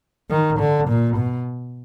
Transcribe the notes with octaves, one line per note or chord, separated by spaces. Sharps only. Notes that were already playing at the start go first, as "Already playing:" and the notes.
D#3
D3
A#2
B2